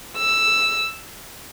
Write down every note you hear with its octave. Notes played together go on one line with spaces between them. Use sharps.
E6